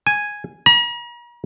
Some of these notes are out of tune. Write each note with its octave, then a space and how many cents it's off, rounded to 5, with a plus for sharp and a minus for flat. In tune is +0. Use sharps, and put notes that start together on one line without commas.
G#5 +0
A#5 +45